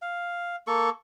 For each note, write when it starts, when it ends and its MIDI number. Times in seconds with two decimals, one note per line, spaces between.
0.02 0.56 77
0.67 0.90 58
0.67 0.90 69
0.67 0.90 85